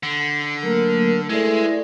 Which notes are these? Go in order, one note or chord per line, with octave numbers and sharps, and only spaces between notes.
D3
F#3 A3 A#3 A#4
G#3 A3 E4 B4 D5